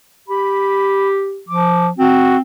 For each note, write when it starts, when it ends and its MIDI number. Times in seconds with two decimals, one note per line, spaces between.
0.29 1.41 67
0.29 1.08 83
1.49 1.90 53
1.49 1.87 86
1.98 2.41 60
1.98 2.36 66